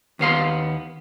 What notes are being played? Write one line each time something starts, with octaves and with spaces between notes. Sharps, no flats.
D#2 B3 F5 C6